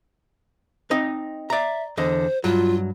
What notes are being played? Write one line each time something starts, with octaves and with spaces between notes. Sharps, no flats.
C4 D#4 D#5
D5 E5 A#5
E2 D3 C5 D#5
G2 F#3 F4